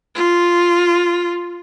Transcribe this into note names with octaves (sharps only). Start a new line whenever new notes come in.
F4